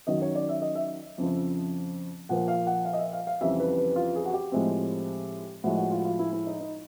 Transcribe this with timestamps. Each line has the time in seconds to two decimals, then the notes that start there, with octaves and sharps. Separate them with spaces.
0.07 F#2 D#3 F#3 D#5
0.22 C#5
0.35 D5
0.49 E5
0.62 D#5
0.75 E5
1.18 F2 C#3 F3
2.29 A#2 F3 A#3 F#5
2.48 F5
2.67 F#5
2.85 F5
2.93 D#5
2.99 E5
3.13 F5
3.27 F5
3.41 F2 C#3 E3 G3 E5
3.60 B4
3.78 B4
3.96 F4
4.16 G#4
4.26 F#4
4.34 G4
4.52 A2 F3 G#3 C4
5.64 A2 F3 G#3 F#4
5.77 F#4
5.92 F4
5.99 F#4
6.05 F4
6.19 E4
6.33 E4
6.47 D#4
6.61 D#4